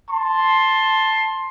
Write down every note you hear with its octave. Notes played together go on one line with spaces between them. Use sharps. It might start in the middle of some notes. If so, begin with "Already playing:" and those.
A5 C6